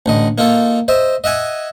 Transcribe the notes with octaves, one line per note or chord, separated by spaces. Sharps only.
A1 D3 D#5
A#3 D#4 F4 A4
C5 D#5 E5
D#5 E5 F#5 G#5